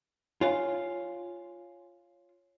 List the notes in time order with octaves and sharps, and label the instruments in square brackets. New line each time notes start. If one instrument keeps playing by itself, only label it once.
[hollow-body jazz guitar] F4 F5 [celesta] C#5 G#5